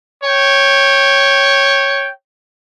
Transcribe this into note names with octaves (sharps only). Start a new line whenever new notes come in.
C#5 G5